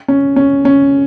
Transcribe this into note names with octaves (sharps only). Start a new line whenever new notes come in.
C#4
C#4
C#4